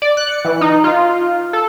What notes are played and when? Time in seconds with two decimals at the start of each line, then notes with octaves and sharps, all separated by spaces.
0.02 D5
0.17 F#6
0.29 C#7
0.45 E3
0.61 D#4
0.84 F4
1.53 A4